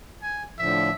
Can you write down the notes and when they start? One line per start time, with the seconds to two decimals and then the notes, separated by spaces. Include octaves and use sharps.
0.22 G#5
0.59 A2 D3 F3 E5